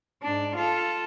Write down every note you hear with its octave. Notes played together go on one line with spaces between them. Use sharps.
G#2 D4
F4 A4